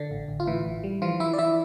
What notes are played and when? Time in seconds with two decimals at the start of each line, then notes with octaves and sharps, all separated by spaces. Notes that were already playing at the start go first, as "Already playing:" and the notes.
Already playing: D3 D4
0.11 A1
0.28 A1
0.40 F4
0.47 A2 E3 E4
0.65 A1
0.84 G3
1.02 E3 F3 F4
1.20 E3 E4 E5
1.33 D5
1.38 E3 E4 E5